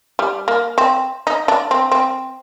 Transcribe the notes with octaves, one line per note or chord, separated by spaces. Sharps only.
G3
A#3
C4
D#4
D4
C4
C4